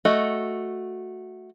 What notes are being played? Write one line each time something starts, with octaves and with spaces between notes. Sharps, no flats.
A3 F#4 D#5